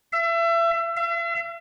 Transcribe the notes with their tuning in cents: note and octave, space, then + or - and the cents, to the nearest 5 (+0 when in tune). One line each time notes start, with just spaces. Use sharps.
E5 +30
E5 +45